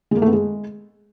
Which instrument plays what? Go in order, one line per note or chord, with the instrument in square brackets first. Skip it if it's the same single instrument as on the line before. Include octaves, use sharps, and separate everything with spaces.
[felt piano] G#3
A#3
A3
B3
G#3